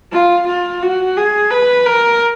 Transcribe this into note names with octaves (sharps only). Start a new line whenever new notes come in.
F4
F4
F#4
G#4
B4
A#4